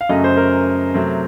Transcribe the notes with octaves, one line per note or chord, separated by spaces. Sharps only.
F5
F#2 C#3 F#3 A3 D#5
C5
A#4
C3 F#3 A3 C4